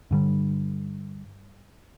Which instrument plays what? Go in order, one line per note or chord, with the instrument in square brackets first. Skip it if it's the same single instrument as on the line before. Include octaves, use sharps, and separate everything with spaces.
[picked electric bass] G2 D3 G3